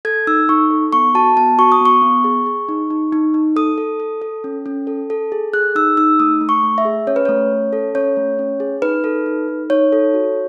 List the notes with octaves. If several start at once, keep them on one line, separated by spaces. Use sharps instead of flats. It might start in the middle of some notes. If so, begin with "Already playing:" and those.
A4 G#6
D#4 E6
D#4 C#6
A4
B3 C#6
F#4 A5
B3 A5
F#4 C#6
D#6
B3 C#6
B3
G#4
G#4
D#4
D#4
D#4
D#4
A4 D#6
A4
A4
A4
C#4
C#4
A4
A4
G#4
G#4 F#6
D#4 E6
D#4 E6
A3 D#6
A3
C#6
A3
E5
G#4
C#4 C#5
B4
A3 C#5
C#4
A4
C#4 C#5
A3
C#4
G#4
D#4 B4
A4
D#4
D#4
D#4 C#5
A4
F#4